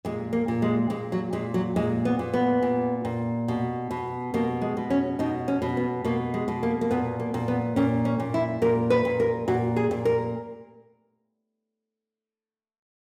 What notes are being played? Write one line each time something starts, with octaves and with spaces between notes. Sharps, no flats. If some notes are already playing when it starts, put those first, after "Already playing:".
A#2 G#3
A#3
A#2
G#3
A#2 G#3
F#3
A#2 G#3
F#3
A#2 G#3
B3
A#2
B3
A#2
A#2
B2
B2
B2 A#3
G#3
B2
C#4
B2 D#4
C#4
B2
B3
B2 A#3
G#3
B2
A#3
A#3
A#2 B3
A#3
A#2
B3
A#2 C#4
C#4
A#2
E4
A#2 A#4
B4
A#2
A#4
A#2 F#4
G#4
A#2
A#4